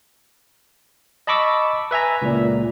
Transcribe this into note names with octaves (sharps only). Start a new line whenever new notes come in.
D#5 A5 B5 C#6 D6 E6
B4 E5 G#5 A#5
C#2 A#2